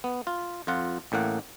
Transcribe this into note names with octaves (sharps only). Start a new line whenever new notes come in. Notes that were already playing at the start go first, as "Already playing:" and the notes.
B3
F4
F2 F4 F#5
A1 A2 A#3 F#5